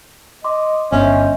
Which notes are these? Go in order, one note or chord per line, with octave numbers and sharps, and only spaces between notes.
D#5 C6 D6
G1 C#4 C5 D#5 E5